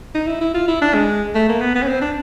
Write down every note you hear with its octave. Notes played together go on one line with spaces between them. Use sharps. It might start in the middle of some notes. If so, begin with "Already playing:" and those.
D#4
E4
E4
F4
E4
D4
G#3
A3
A#3
B3
B3
C#4
C4
D4